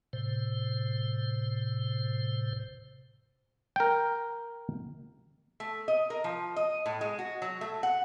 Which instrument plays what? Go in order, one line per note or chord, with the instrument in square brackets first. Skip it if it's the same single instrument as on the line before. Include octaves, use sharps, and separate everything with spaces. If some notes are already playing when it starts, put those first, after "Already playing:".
[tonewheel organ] A2 C3 C5
[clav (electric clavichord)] A#4 G5
[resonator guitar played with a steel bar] A3
D#5
A#4
F3
D#5
A2
G#3
F#4
F#3
A3
F#5